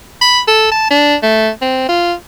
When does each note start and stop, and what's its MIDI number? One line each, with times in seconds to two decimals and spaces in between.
0.21 0.40 83
0.48 0.69 69
0.71 0.90 81
0.91 1.15 62
1.23 1.49 57
1.62 1.84 60
1.89 2.13 65